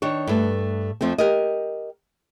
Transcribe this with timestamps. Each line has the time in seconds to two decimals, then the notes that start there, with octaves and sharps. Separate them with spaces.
0.02 D#3 D4 C#5
0.27 G2 A3
1.01 F2 F3 A3 C4
1.18 G4 A#4 D#5